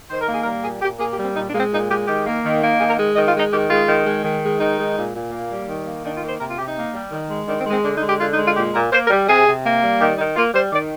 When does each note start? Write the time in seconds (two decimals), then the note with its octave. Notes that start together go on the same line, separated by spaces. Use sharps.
0.10 D#3 C5
0.21 A#4
0.28 A#3 G#4
0.43 A#4
0.46 G3
0.63 A#2 G#4
0.82 A#2 G4
0.99 A#3 G#4
1.12 G4
1.17 G3
1.24 C4
1.36 A#2 D#4
1.48 D4
1.54 G#3 A#3
1.60 C4
1.72 A#2 D#4
1.90 G#3 G4
2.08 D#3 G4
2.26 A#3
2.44 D#3
2.62 A#3
2.80 D#3 G#4
2.89 A#4
2.98 G#3
3.16 D#3 D#5
3.28 F4
3.35 G#3
3.40 D#4
3.51 D#3 G4
3.70 G#3 F4
3.88 D#3
4.06 G#3
4.24 D#3
4.42 G#3
4.60 D#3 D#4
4.78 G#3
4.96 A#2
5.14 A#2
5.32 A#3
5.50 G3
5.68 D#3
5.86 A#3
6.04 D#3 D4
6.16 F4
6.22 A#3
6.28 C5
6.40 C3 A#4
6.49 F4
6.58 C3 G4
6.67 D#4
6.76 A#3
6.94 G3
7.12 D#3
7.30 G#3
7.48 D#3 D4
7.60 C4
7.66 G#3
7.72 C4
7.84 D3 D4
7.96 D#4
8.02 G#3
8.08 G4
8.20 D3 F4
8.33 D#4
8.38 G#3
8.45 F4
8.56 A#2 G4
8.74 A#2 A#4
8.92 A#3 C5
9.05 A#4
9.10 G3
9.28 C3 G#4
9.46 C3
9.65 A#3
9.82 G3
10.01 D#3 G4
10.18 D#3 D#4
10.36 A#3 F4
10.54 G3 C5
10.73 D#3 D5